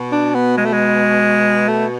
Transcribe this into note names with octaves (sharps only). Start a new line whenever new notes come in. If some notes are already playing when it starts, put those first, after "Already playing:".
Already playing: B2
D4
B3
G#3
A3
G#3
A3